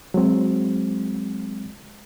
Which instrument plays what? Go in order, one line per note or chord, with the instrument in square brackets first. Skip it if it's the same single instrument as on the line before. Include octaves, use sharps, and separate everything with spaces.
[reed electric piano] F#3 G#3 C4